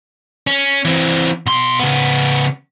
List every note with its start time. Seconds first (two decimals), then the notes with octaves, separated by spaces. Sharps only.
0.47 C#4
0.85 E3 C4
1.46 B2 C6
1.80 C#3 B3